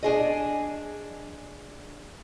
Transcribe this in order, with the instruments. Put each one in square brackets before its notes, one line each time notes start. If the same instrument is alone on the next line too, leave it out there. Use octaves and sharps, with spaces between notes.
[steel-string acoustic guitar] D4 G#4 D#5